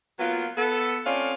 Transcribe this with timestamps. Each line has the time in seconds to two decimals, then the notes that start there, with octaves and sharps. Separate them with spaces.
0.19 F#3 A#3 B3 F4
0.57 B3 A4
1.05 A3 C4 C#4 F4 D5 F5